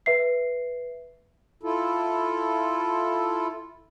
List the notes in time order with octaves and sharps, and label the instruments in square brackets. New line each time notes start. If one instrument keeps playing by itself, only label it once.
[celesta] B4 E5 C7
[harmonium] E4 F4 A4